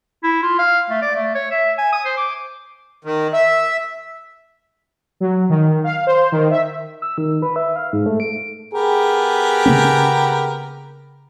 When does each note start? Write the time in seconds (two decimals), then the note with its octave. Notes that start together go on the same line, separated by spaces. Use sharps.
0.23 E4
0.43 F4
0.59 F5
0.90 A3
1.02 D5
1.16 A3
1.35 C#5
1.51 E5
1.78 G#5
1.92 D#6
2.05 C5
2.17 D6
3.05 D#3
3.33 E5
5.20 F#3
5.50 D#3
5.84 F5
6.07 C5
6.32 D#3
6.51 E5
7.02 E6
7.18 D#3
7.42 B4
7.56 E5
7.76 F5
7.93 G#2
8.06 A3
8.20 D7
8.74 B3 G4 G#4 A#4
9.66 C#3 A#3 C#4